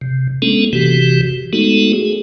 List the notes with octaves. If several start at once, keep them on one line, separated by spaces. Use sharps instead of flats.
C3
G#3 A#3 B3 C#4 D4 A4
C3 E3 F#4 G4
G#3 A3 B3 D#4 F#4 A4
G#4